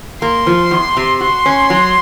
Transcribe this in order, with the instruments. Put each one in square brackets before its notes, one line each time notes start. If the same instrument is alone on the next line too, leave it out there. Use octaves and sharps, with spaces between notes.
[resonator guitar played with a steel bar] A#3 [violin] C6
[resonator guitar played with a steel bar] F3
E2
C3
[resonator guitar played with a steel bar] F#4 [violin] C6
[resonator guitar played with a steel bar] C#4
F#3